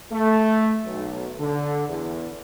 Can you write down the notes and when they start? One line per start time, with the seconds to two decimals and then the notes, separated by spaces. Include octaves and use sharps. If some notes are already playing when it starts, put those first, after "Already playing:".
0.11 A3
0.84 B1
1.39 D3
1.88 E2